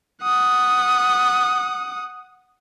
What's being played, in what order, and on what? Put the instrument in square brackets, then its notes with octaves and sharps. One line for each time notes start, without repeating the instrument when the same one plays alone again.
[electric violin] F#5 D#6